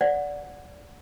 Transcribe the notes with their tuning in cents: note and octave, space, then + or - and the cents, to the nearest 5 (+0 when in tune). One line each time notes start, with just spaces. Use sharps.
D5 -15 F#5 -10